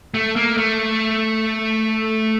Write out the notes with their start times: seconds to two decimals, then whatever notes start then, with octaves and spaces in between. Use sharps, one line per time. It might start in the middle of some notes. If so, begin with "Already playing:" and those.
0.14 A3
0.36 A#3
0.58 A3